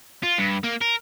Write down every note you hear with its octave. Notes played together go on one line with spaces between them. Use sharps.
F4
G2
A#3
A#4